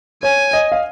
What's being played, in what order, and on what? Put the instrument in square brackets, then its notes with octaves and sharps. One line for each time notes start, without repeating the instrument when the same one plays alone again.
[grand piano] C#5 [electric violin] G#5
[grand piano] D#5
F5